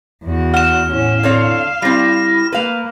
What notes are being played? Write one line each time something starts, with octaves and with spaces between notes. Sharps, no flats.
E2 F#4
F#5 F6 E7
A2 C#4
D3 C4 C#5 F5
G3 C4 E4 A#6
A#3 B4 F5